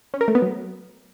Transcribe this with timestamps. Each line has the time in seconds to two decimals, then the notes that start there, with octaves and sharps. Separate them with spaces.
0.14 C#4
0.21 A#4
0.28 A3
0.35 B3
0.42 F#3